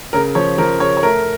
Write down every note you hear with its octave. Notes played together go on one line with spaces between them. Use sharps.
C#3 A#4
F3 C#5
F3 A#4
C#3 C#5
C#5
A3 A#4